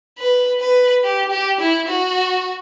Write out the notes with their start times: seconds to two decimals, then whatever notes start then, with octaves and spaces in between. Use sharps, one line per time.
0.18 B4
0.60 B4
1.03 G4
1.31 G4
1.60 E4
1.88 F#4